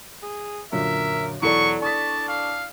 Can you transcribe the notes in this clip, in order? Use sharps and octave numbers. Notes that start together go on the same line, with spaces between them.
G#4
F#2 A#2 D3 A#4 E5
E1 F#3 E4 A4 D5 C#6
D4 A5 C#6 D#6 B6
F5